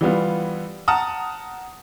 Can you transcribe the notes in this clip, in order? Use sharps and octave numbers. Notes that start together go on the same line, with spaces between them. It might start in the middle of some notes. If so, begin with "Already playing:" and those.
E3 G3 B3 F4
F#5 A5 A#5 D#6 F6